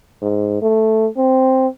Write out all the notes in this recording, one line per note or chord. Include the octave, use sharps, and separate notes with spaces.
G#2
A3
C4